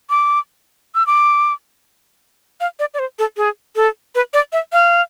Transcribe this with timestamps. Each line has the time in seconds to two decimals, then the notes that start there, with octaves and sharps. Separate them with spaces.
0.10 D6
0.95 E6
1.07 D6
2.60 F5
2.79 D5
2.94 D5
2.99 C5
3.19 A4
3.37 G#4
3.76 A4
4.15 B4
4.34 D5
4.53 E5
4.72 F5